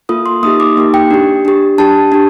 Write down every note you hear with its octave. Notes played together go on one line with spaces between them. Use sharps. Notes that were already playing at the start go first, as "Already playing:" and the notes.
A#3 F4 A4 D#6
C6
A#3 D#4 G4 D#6
D6
A#3 D#4 G4
G5
D4 G4
D4 G4
D4 G4 A5
D4 G4